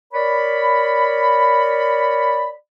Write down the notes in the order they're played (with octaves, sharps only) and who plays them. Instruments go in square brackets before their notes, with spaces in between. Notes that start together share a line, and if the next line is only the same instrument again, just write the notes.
[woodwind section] A#4 C#5 D5 B5